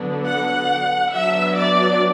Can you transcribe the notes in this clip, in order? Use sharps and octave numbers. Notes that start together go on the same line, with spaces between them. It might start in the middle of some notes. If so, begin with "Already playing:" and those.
Already playing: D3 F#3 B3 D4
F#5
F#3 B3 D4 E5
D5